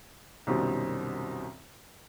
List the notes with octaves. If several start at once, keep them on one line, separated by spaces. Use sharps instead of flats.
C2 F#2 B2 D#3 G3 C4